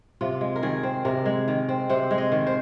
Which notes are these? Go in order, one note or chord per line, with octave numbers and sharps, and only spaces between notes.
C3 F4
G#3
A#4
D#3 G#4
C4
C3 A#4
G#3
D#3
C4
C3 C5
G#3
D#5
D#3
C5